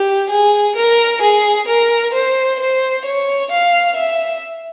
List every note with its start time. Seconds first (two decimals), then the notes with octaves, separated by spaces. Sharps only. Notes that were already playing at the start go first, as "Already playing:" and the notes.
Already playing: G4
0.30 G#4
0.76 A#4
1.22 G#4
1.68 A#4
2.14 C5
2.60 C5
3.05 C#5
3.52 F5
3.97 E5